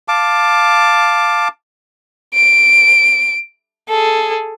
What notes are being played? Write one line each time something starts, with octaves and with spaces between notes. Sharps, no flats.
F5 A5 D6
D7
G#4 A4